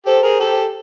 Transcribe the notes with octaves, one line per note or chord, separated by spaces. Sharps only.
G4 A4 C5
G#4 A#4
G4 A4